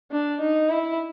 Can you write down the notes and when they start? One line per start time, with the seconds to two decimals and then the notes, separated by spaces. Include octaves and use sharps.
0.12 D4
0.41 D#4
0.69 E4